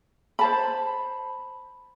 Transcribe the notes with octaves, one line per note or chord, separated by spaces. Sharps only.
C5 A5 B5